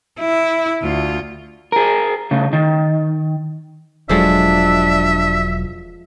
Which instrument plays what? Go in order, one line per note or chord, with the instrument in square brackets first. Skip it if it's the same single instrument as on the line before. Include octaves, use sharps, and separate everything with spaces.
[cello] E4
D2 F4
[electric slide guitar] G#4 A#4
C#3 A3
D#3
[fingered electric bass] E1 F#3 [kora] F3 G#3 A4 [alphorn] D4 [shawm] E5